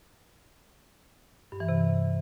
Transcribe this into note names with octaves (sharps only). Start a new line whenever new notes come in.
G2
E3
C3